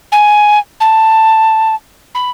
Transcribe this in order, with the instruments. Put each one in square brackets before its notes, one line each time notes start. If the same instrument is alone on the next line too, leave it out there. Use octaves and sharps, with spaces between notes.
[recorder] G#5
A5
B5